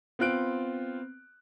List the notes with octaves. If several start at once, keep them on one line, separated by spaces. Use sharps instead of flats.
B3 C4 F4 F#6 D7